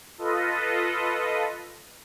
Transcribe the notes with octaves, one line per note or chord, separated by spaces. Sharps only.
F4 A4 B4 D#5